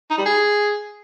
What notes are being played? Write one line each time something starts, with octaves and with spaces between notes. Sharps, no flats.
D#4
G3
G#4